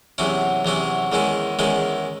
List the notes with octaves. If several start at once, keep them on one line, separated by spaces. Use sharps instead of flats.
E2 C3 F#3 C#4 E4
E2 C3 F#3 C#4 E4
E2 D#3 G#3 C#4 E4
E2 D#3 G#3 C#4 E4